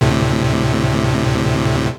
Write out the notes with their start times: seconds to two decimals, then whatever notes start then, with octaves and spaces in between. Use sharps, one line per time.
0.01 D2 A2 C3